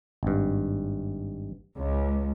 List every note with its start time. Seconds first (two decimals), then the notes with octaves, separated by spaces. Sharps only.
0.23 G#1 G2
1.76 C#2